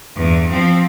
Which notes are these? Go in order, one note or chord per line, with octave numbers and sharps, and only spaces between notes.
E2 G2
F3 C4